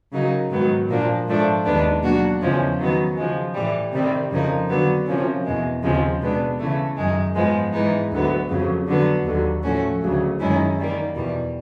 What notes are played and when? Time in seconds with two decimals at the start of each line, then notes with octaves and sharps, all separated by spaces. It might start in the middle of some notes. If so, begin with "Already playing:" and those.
0.12 C#3 F#3 A#3 D#4
0.50 G#2 D#3 F#3 B3
0.88 A#2 F3 A#3 D4
1.26 G#2 F3 A3 D4
1.64 D#2 D#3 G#3 B3 D4
2.02 B2 F#3 A#3 D4 F#4
2.40 E2 C#3 F3 G#3 C#4
2.78 D#3 F#3 B3
3.16 C#3 F3 G#3
3.54 A2 E3 G3
3.93 C3 D#3 G3 C4
4.31 F2 C#3 F3 A#3 D#4
4.68 D3 F#3 B3
5.06 C3 F3 A#3 C#4
5.45 E2 B2 G#3
5.83 D#2 C#3 F3 G#3 C4
6.21 B2 G#3 B3 D4
6.58 C#3 E3 A3
6.96 F#2 D#3 G#3
7.35 G#2 F3 G#3 B3
7.73 G#2 E3 G#3 B3 D#4
8.11 D2 D3 F#3 B3
8.49 F2 C#3 F#3
8.87 D3 F#3 B3
9.25 D#2 D3 F#3
9.63 A2 F3 A3 C#4 F#4
10.01 D2 C#3 F#3
10.39 F#2 D#3 G#3 C#4 E4
10.77 D#3 G3 A#3
11.15 E2 B2 G3